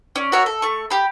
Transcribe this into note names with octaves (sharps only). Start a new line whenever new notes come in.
C#4 D5
F#4 A#4 C#5 E5
A4
A3 C#6
G4 B5